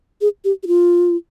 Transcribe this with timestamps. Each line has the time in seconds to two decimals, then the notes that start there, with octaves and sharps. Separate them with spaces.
0.21 G#4
0.45 G4
0.63 G4
0.67 F4